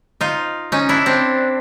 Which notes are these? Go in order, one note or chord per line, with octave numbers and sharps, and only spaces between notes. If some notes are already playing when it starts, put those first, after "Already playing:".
D#4 F4
C#4 D#4
D4 E4
C4 D4